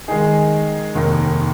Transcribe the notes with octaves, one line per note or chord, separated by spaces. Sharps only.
D#3 G#3 D#4 G#4
F1 D#2 D#3 A#3